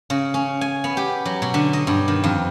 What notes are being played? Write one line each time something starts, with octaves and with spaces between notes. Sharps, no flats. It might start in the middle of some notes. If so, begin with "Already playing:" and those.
C#3
C#4
G#5
B3
G4
F#3
B2
D3
D#5
G2
D#3
F2